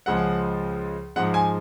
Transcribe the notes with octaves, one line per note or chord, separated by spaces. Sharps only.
C#2 C#3 F3 G#3 F#5
G#2 F3 G#3 F#5
G#5